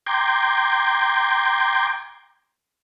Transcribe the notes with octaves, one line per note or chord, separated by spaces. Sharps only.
G5 A#5 C6 D6 G6 G#6